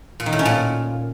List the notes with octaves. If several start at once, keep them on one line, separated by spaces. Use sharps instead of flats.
A#2
D#3
A2
C#4
A#2